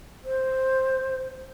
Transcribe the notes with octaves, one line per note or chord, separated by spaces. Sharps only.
C5